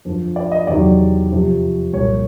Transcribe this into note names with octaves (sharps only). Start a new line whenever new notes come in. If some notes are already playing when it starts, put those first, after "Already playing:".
F2 D3 F3
D5
D#5
E2 C3 D#3 F#3 D5
F2 C3 F3
C2 A#2 F3 C#5